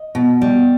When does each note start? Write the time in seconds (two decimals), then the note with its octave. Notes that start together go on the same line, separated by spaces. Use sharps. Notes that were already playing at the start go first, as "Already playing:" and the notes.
Already playing: D#5
0.15 B2
0.41 G3